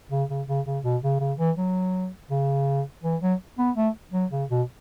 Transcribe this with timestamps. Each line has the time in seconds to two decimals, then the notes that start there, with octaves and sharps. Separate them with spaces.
0.11 C#3
0.30 C#3
0.48 C#3
0.66 C#3
0.84 B2
1.03 C#3
1.20 C#3
1.38 E3
1.57 F#3
2.30 C#3
3.04 E3
3.21 F#3
3.58 B3
3.76 A3
4.13 F#3
4.31 C#3
4.50 B2